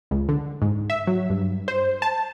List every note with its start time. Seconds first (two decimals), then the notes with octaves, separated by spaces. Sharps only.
0.11 C#2
0.29 D3
0.62 G#2
0.90 E5
1.07 F#3
1.30 G2
1.68 C5
2.02 A5